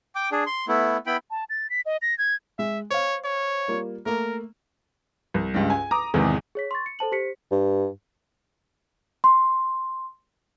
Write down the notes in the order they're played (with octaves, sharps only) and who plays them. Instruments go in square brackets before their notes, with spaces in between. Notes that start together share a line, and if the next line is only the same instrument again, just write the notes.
[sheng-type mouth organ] G5 D6
D4 G#4
C6
A3 B3 E4
B3 E4 G5 B5
[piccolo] A5
A6
B6
D#5
A#6
G#6
[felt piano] G#3 [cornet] E5
[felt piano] C5 F5 [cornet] C#5
[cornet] C#5
[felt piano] G3 A#3 F4
[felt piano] A3 A#3 [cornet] A#4
[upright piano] C2
C#2 G2
G#5
A#5 D6 D#6
E2 G#2 C3 D#3 E3
[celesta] G#4 C#5 B6
C6 C#6 A6
C#7
A4 C5 A5 F#7
G4 C5 B6 C#7
[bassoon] G2
[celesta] C6